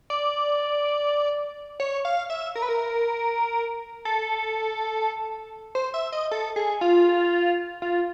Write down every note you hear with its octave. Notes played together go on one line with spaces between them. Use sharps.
D5
C#5
F5
E5
A#4
B4
A#4
A4
C5
E5
D#5
A4
G#4
F4
F4